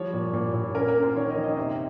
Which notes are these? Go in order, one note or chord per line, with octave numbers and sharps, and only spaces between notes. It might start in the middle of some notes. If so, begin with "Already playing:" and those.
Already playing: F3 G3 C#5
A#2
A#2
A#2
C#4 A#4
A#4
C#4
C5
D#3 C#5
D#5
D#3
D#5
C3 C5